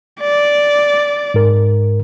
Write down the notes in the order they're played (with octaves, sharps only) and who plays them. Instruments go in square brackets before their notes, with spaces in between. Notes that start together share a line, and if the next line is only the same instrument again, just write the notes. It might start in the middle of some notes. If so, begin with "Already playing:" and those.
[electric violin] D5
[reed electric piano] G#2 A#4